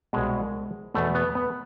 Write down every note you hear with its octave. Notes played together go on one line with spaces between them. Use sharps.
C2 B2 G#3
E2 B2 A3
B3
B3